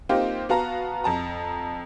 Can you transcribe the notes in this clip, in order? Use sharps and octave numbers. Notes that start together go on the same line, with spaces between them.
A#3 C4 D#4 F4 G4
B3 F#4 F5 A5 A#5
F2 A5 A#5